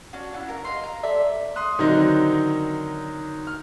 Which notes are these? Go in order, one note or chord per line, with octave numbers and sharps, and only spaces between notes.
C#4 D4 F#4
E4 F#5 A5
A#4 A#5
D#5 F5 C6
A#5
A4 D5 E5
C6 D#6 F#6
D3 D#3 F#3 C4 D#4
F6